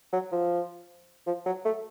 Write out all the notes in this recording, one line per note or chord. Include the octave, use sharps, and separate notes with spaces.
F#3
F3
F3
F#3
A3